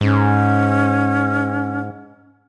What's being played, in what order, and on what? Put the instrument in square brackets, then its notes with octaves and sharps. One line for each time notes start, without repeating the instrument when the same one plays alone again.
[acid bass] G#2 [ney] C#4